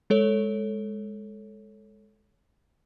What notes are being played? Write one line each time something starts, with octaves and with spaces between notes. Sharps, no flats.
G#3 A4 C#5